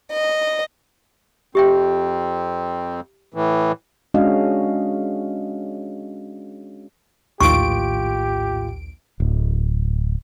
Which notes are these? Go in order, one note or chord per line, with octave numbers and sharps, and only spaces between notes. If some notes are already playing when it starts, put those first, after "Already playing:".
D#5
F2 C4 G4 E5 G5
A2 E3
G#3 C#4 D4 F#4 D#5 F5
A#1 D#2 A2 F4 G4 C#6 D7
D1